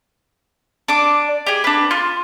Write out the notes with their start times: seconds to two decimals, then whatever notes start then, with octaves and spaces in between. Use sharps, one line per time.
0.88 D4 D5 D6
1.46 G4 G#4
1.64 D4 B4
1.91 F4